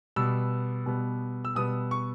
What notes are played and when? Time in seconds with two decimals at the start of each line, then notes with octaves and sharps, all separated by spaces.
0.16 B2 G3 B3 E6
0.86 B2 G3 B3
1.45 E6
1.55 B2 G3 B3 D#6
1.91 C#6